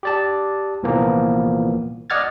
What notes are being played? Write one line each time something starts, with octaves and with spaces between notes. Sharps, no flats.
G4 D5 A5
C2 A#2 E3 F3 A#3 B3
D5 D#5 F#5 F6 G#6 A6